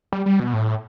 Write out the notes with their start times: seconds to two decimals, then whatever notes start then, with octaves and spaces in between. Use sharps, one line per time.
0.12 G3
0.26 G3
0.40 B2
0.53 A2